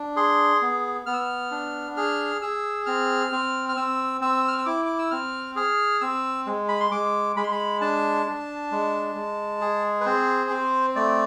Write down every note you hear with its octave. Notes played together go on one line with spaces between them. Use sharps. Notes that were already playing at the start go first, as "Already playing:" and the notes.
Already playing: D4
G#4 C6
B3
B3 F6
E6
F6
D4
G#4 F6
G#4 E6
C4 F6
C4
F6
C4 E6
C4 E6
F6
E6
E4 D6
D6
E6
C4 F6
G#4 F6
C4 E6
G#3
B5
C6
G#3 D6
G#3 B5
C6
B5
D4 A5
D4
G#3
G#3
G#4
B4
C4 C5
C4
A3 D5